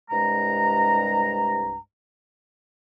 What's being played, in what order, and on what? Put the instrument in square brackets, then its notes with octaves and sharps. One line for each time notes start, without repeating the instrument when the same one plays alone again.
[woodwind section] C2 G2 G#3 A#5